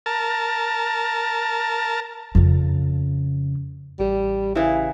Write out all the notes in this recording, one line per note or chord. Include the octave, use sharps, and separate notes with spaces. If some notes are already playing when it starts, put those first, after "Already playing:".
A#4 A5
F2 C#3
A1 G3 G4
C#3 E3 E4